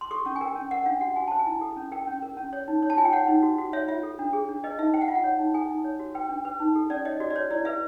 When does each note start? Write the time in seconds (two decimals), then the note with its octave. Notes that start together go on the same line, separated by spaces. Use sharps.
0.01 C6
0.11 A4 C#6
0.25 C#4 C#6
0.36 G#5
0.41 A#4 G5
0.55 C#4
0.71 A#4 F#5
0.86 D4 F5
1.01 F#4 F#5
1.16 F#4 G#5
1.28 C5 A5
1.39 G#5
1.46 E4
1.61 A4
1.77 C#4
1.92 A#4 G5
2.07 C#4
2.22 A#4
2.37 C#4
2.53 C#5
2.68 D#4
2.82 C#5
2.90 A5
2.97 F4 G#5
3.05 G5
3.13 C#5 F#5
3.28 D#4
3.43 F#4
3.58 F#4
3.73 C#5 E5
3.88 F4 E5
4.03 A4
4.19 D4
4.33 G#4
4.49 D4
4.64 B4 D#5
4.79 D#4 E5
4.94 C5 G5
5.01 F#5
5.08 F4 F5
5.15 F#5
5.24 C#5
5.39 D#4
5.54 A4 G#5
5.70 D#4
5.84 C#5
6.00 F#4
6.15 B4 G5
6.29 D4
6.45 B4
6.60 D#4
6.75 A4
6.90 C#4 D5
7.05 C#5 D#5
7.20 F#4 D5
7.30 D5
7.36 C5 C#5
7.51 E4 D5
7.65 B4 E5